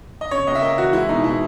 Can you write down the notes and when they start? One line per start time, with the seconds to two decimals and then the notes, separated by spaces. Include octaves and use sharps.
0.21 D#5
0.31 C#3 C#5
0.47 C#2 D#5
0.55 E5
0.62 A#3 D#5
0.78 E3 F#4
0.93 G#3 E4
1.09 B2 D#4
1.24 B2 E4